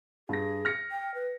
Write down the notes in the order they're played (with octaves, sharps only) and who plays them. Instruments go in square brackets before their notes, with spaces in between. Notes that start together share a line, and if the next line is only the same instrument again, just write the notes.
[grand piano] G2 A#6 [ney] G#4
[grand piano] F6 A#6 C#7
[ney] G5
B4